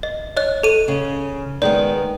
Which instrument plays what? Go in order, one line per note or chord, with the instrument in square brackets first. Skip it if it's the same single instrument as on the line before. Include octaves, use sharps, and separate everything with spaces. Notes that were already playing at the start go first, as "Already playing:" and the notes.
[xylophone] D#5
C#5 D#5 F#6
A4 D#7
[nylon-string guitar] C#3
[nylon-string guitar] D#3 G#3 B3 [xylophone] D5